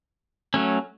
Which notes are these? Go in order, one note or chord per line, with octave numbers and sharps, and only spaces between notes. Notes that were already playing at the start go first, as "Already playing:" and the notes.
F#3 A3 C#4